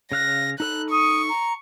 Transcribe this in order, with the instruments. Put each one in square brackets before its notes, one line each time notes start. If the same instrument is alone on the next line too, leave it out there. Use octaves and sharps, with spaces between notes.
[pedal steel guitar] C#3 F5 F#6 [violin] A#6
[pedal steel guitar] D#4 A4 B5 [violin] F#6
[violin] C#6 [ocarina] D#6
[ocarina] A#5